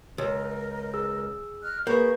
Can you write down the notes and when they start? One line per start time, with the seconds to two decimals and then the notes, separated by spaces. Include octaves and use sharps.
0.18 C#2 A#4 D#5
0.94 G#4 E6
1.62 D#5 F6 F#6
1.87 A#3 G#4 B4 B5 C#6 G6